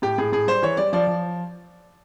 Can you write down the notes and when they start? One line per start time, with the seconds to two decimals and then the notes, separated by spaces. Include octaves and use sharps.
0.02 A2 G4
0.18 A2 G#4
0.33 A2 G#4
0.47 G3 C5
0.62 E3 C#5
0.77 G3 D5
0.93 F3 D5
1.07 F3